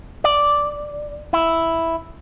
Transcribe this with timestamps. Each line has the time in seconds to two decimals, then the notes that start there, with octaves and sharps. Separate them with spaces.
0.24 D5
1.33 E4